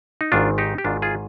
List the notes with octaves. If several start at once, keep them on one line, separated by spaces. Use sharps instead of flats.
D#4
G#1 G#2 D#3 D4 F4
D#4 G4
G4
G#1 G#2 D#3 D4 F4
F4 G#4